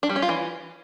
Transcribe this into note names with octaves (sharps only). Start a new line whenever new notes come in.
D4
G3
C#4
F4
E3